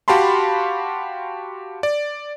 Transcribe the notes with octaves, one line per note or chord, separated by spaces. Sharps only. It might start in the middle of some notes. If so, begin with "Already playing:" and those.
F#4 G4 F5 A5 B5 C6
D5